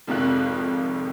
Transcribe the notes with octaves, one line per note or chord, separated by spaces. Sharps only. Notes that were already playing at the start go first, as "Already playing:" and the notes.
G#1 F2 C3 D#3 F3 F#6